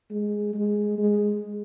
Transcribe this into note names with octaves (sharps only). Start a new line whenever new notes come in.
G#3
G#3
G#3